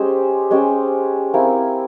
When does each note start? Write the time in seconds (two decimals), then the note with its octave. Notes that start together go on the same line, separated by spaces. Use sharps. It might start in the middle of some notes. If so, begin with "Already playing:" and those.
Already playing: G#3 C#4 G4 C5
0.51 G#3 C#4 G4 C5
1.34 C4 E4 A#4 F5